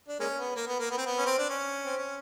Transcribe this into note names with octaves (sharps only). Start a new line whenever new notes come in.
D4
G#3 A#3 C#4
B3
A#3
B3
A#3
B3
C4
B3
C#4
C4
D4
C#4
C4
C#4